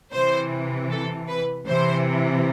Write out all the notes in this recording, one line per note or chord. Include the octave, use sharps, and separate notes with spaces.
C3 E3 C5
A4
B4
C3 E3 C5